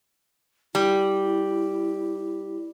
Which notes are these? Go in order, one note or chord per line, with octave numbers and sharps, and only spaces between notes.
G3 E4